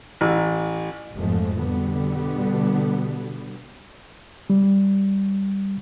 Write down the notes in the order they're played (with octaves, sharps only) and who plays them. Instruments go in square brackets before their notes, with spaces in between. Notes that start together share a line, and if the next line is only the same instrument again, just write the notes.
[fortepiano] A1
[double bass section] F1 F2 G#2 F3 G#3 A3
B2 D3 G3 B3
[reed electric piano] G3